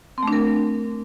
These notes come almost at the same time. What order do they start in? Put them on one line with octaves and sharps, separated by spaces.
C4 A3 D4 A#4